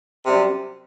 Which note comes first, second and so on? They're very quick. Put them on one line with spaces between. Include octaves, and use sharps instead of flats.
C3 G3 F#2